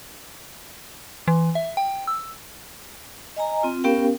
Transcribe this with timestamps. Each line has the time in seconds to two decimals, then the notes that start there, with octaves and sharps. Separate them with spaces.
1.28 E3
1.55 E5
1.77 G5
2.07 E6
3.36 D#5 G#5 A#5
3.63 C4 F4
3.84 B3 C#4 G4 A#4 F5 G5